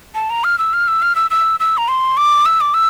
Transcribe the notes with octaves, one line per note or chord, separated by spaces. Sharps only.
A5
A#5
F6
E6
F6
E6
F6
E6
E6
E6
A#5
C6
D6
E6
D6
E6